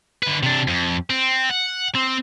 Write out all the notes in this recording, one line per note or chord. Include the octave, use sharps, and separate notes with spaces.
D3 B4
C3 D4
F2
C4
F#5
C4